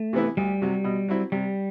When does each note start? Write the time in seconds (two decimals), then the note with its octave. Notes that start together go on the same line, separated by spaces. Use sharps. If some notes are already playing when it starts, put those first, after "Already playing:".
Already playing: A3
0.13 C3 E3 B3 E4
0.37 D2 G3
0.62 C3 F#3
0.84 B2
1.08 F#3 C4 E4
1.32 C3 G3